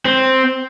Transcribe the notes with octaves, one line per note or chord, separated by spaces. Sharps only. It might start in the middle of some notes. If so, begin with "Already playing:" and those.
C4